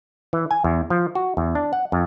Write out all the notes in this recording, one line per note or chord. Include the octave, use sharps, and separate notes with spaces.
E3
G#5
E2
F3
F#4
E2
D4
F#5
F2